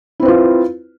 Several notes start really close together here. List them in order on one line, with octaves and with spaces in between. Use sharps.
E4 C4 B4 F4